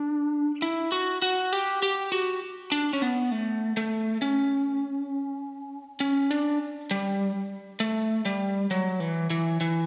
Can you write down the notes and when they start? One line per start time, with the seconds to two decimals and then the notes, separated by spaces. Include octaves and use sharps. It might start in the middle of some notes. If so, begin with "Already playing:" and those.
Already playing: D4
0.62 E4
0.92 F#4
1.22 F#4
1.53 G4
1.82 G4
2.12 F#4
2.72 D4
2.93 C#4
3.02 B3
3.32 A3
3.77 A3
4.22 C#4
6.00 C#4
6.31 D4
6.91 G3
7.80 A3
8.25 G3
8.71 F#3
9.00 E3
9.30 E3
9.61 E3